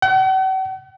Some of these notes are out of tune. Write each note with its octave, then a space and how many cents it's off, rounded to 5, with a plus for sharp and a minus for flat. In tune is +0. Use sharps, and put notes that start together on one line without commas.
F#5 +45